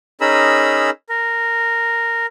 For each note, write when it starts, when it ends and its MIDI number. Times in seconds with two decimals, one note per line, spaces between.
0.21 0.90 61
0.21 0.90 63
0.21 0.90 68
0.21 0.90 70
0.21 0.90 83
0.21 0.90 88
1.09 2.26 70